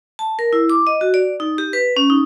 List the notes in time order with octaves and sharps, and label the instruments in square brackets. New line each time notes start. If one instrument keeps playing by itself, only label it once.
[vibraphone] A5
A#4
E4
D6
D#5
F#4
D5
D#4
G4
B4
C#4
D#4